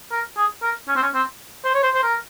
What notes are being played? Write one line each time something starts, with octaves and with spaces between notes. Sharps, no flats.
A#4
G#4
A#4
C#4
C4
C#4
C4
C5
C#5
C5
C5
A#4